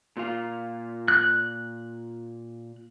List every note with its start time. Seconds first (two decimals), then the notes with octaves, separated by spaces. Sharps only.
0.17 A#2 F4 F5
1.08 F#6